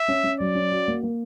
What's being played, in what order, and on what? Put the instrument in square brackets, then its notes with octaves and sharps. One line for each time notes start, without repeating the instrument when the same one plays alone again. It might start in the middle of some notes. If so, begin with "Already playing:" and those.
Already playing: [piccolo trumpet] E5
[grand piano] C#4
C#4
[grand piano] F#3 [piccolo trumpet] D5
[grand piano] C#4
F#4
A#3
A#3